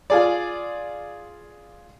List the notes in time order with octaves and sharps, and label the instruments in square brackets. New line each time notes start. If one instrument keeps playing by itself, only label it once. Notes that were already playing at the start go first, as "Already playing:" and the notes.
[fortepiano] F4 G#4 D5